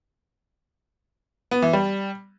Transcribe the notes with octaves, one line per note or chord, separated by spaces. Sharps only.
B3
E3
G3